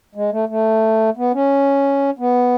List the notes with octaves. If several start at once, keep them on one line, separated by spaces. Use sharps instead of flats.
G#3
A3
A3
B3
C#4
B3